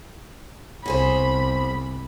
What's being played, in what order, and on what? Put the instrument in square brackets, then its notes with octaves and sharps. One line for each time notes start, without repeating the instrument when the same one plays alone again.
[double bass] C2 [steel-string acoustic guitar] B2 G#4 C5 [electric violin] B5